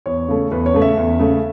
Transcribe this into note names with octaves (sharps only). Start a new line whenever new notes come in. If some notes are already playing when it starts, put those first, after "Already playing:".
E2 C#5
C#3 A3
E2 B4
C#5
C#3 A3
E5
E2
C#3 A3